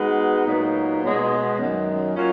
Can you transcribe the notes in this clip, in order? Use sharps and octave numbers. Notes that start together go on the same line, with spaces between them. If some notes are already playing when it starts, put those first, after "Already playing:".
Already playing: G#3 B3 D#4 F#4 B4
A#2 F#3 B3 D#4
B2 G#3 B3 F#4 C#5
F#2 D#3 F#3
F#3 A#3 C#4 F4